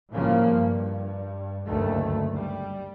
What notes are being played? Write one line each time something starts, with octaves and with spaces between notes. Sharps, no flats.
A2 C#3 E3 F3 G3 A#3
G2
F#1 D2 G2 D#3 A3
G3